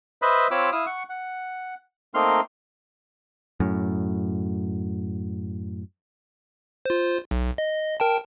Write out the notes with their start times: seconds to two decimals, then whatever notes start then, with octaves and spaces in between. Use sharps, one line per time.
0.22 B4 C5 D#5 E5 B5
0.51 C4 F4 C#5 B5 D6 E6
0.72 E4 F5 D#6 E6
0.86 F#5 C#6
1.09 F#5
2.14 A3 A#3 C4 D#4 C6 F6
3.60 F#2 A2
6.85 F4 C5
7.31 B1
7.58 D#5
8.00 A#4 G5 A5